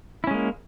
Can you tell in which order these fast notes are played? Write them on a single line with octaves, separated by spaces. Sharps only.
E4 C#4 G#3 A#3